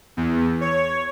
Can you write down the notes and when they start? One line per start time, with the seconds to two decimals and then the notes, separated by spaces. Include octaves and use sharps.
0.17 E2
0.61 C#5